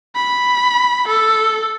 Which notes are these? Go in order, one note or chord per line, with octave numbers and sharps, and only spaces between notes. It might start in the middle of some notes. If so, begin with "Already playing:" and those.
B5
A4